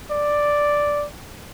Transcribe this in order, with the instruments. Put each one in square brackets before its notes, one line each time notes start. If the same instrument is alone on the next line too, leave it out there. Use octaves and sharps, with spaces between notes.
[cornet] D5